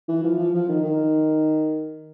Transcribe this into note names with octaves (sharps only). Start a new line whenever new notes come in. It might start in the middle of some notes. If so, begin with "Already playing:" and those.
E3
F3
F3
F3
D#3
D#3